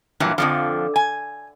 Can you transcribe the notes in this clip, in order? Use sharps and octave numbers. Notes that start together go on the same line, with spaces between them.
G2 A#2 E3 F#3
F2 D3 F3
G#5